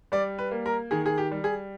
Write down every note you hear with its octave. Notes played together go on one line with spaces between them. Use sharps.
G3 D5
B4
A#3
A#4
D#3 G#4
G#4
G4
G3
G#4